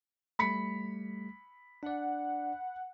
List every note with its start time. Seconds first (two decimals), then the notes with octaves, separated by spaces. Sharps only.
0.39 G3 A3 B5 B6 C#7
1.83 D4 D5 F#5